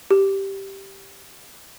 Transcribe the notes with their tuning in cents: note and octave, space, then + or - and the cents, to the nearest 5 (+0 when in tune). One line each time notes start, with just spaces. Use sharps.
G4 -5